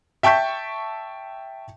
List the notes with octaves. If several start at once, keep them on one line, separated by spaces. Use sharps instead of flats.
E5 G5 A5 C#6 G6 B6